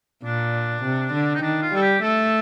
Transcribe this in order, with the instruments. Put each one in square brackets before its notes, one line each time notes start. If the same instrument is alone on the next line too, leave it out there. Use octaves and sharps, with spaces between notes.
[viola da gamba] A#2 [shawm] D4
[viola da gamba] C3
D3
[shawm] D#4
[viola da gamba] D#3 [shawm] D4
[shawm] F4
[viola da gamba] G3 [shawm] A4
[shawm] G4
[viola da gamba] A3 [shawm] A4